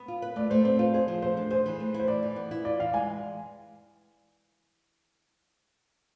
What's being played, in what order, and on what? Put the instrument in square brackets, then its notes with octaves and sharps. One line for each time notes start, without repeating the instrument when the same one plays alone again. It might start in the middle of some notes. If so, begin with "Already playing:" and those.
Already playing: [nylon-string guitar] B3
F4
B4
[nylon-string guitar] A3 [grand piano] D5
[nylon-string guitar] A3 [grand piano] C5
[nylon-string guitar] C4 [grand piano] C5
[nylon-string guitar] F4 [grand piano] C5
[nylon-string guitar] G#4 [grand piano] C5
[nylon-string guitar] F3
[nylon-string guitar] A3 [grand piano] C5
[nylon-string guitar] D4
[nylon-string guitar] G#4 [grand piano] C5
[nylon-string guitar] E3
A3
E4
[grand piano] C5
[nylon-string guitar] E3 [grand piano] D5
[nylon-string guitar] E3
B3
E4
[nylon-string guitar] F4 [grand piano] D5
[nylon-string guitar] E3 [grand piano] F5
[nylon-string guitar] G#3 [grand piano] G#5